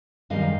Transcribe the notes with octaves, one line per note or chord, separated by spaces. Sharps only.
F#2 D#3 G3 D#5 F5